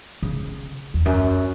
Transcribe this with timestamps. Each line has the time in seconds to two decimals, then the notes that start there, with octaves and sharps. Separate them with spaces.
0.22 C#3
0.94 E2
1.05 F#2